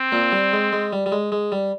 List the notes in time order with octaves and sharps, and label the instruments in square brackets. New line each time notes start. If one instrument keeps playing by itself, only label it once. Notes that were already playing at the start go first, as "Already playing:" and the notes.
Already playing: [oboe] C4
[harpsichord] A#2 A#3
G3
G#3
G#3
G3
G3
G#3
G#3
G3